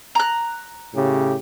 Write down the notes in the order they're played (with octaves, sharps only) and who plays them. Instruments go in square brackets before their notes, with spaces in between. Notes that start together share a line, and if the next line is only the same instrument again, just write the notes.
[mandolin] A#5 F#6
[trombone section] A2 C#3 G4